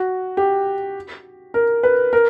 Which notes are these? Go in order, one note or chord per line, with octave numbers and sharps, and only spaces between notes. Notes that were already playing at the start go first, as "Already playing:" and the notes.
Already playing: F#4
G4
A#4
B4
A#4